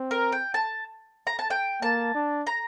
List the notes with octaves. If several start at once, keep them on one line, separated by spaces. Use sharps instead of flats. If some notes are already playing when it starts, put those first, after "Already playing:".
Already playing: C4
A#4
G5
A5
A#5
A5
G5
A#3 A5
D4
A#5